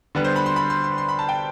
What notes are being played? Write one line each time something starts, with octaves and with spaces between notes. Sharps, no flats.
D3 G3 B3
C5
B5
C6
B5
C6
C6
C6
B5
A5
G5